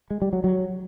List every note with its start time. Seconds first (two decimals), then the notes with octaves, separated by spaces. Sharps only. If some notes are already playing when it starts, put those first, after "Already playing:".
0.11 G#3
0.22 G3
0.33 F#3
0.44 F#3